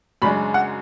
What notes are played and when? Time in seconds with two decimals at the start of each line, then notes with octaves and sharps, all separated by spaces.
0.22 F#2 C#3 G#3 D4 B5
0.54 F#5